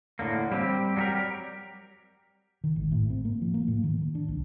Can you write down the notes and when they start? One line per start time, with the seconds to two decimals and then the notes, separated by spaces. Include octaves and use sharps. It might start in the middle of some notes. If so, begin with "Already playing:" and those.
0.19 A2 D3 A#3
0.52 G3 C4 G4
0.96 F#3 G3 F#4 G4 A#4
2.64 D#3
2.76 G#1
2.92 A2
3.10 C4
3.25 A#3
3.42 F3
3.54 A#3
3.68 A2
3.84 D#3
3.98 D#3
4.15 D4
4.28 C2